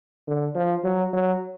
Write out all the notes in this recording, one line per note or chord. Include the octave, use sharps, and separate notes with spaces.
D3
F3
F#3
F#3